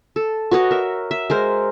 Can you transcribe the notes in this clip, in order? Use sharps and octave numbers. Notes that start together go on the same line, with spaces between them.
A4
F#4 B4 C#5 D#5
A#4 E5
E5
G#3 A#4 C5